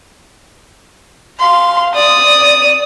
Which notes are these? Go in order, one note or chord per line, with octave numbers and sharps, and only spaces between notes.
F5 C6
D5 D#6